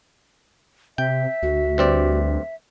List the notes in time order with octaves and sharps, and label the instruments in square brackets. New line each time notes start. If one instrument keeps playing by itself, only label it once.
[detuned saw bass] C3 [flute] E5 [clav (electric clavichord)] G5
[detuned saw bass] D2 [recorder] F#4
[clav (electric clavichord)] G2 C4 D5